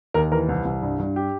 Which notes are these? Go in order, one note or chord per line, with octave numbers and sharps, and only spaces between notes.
D#2 A#4
E3 A#4
C2
C2
G2
G2
G4